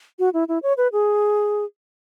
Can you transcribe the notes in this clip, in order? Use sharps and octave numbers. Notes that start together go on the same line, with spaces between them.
F#4
E4
E4
C#5
B4
G#4